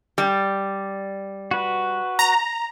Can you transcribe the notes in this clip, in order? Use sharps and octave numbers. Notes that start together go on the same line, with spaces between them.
G3
F#4 B4
A#5